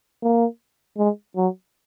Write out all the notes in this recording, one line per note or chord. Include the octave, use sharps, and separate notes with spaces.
A#3
G#3
F#3